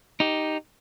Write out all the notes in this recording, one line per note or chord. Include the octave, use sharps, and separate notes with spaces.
D#4 G4